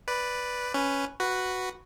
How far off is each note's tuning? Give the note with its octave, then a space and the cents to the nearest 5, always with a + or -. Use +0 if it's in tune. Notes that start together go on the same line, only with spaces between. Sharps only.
B4 +0 D5 +0
C#4 +0 B4 +0
F#4 +0 B4 +0